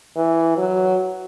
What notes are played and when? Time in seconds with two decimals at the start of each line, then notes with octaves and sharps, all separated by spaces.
0.16 E3
0.58 F#3